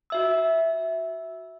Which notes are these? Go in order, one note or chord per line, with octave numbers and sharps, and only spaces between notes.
F#4 E5 E6